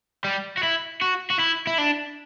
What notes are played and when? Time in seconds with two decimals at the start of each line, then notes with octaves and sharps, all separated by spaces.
0.24 G3
0.58 F#4
0.63 E4
1.01 F#4
1.30 F#4
1.39 E4
1.67 E4
1.78 D4